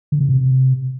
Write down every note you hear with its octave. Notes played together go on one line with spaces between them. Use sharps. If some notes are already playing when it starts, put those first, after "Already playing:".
D3
C#3
C3